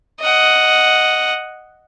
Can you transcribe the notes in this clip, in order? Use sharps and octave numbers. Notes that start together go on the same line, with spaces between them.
D#5 F#5